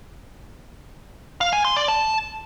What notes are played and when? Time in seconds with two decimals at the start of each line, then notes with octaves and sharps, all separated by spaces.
1.41 F5
1.53 G#5
1.65 C6
1.76 D5
1.88 A5